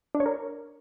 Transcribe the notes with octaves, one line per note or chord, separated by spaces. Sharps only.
D4
C#5
A#4